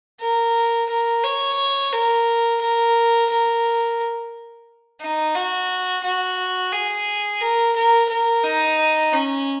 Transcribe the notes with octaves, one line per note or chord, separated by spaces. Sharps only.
A#4
A#4
C#5
A#4
A#4
A#4
D#4
F#4
F#4
G#4
A#4
A#4
A#4
D#4
C#4